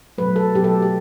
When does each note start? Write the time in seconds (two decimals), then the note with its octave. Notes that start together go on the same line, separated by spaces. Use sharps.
0.18 B2 F#3 A3 B4
0.36 A4
0.54 B2 F#3 A3 G4
0.64 A4
0.82 G4